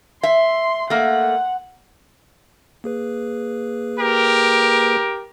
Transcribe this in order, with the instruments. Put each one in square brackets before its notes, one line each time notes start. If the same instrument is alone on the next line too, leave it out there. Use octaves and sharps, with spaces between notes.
[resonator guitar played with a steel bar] E5 [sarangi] C6
[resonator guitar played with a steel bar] A3 A#3 [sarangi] F#5
[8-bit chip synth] A#3 G#4 B4
[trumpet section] G4 A#4